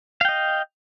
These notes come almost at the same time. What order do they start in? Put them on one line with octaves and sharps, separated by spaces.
F5 G5 D#5